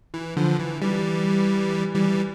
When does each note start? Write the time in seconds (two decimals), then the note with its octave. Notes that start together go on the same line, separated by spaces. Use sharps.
0.14 E3
0.37 D3 F3
0.59 E3
0.82 E3 G3
1.94 E3 G3